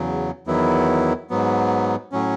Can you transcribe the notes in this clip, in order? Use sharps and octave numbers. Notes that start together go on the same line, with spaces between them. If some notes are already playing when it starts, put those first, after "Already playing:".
Already playing: E2 C#3 F#3
E2 D#3 F#3 B3 E4
G#2 F#3 B3
A2 F#3 C#4